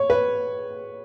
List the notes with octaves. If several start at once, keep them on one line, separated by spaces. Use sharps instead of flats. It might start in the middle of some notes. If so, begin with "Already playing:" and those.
Already playing: C#5
B4